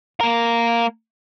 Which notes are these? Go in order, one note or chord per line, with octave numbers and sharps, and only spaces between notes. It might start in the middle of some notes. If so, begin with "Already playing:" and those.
A#3 A#4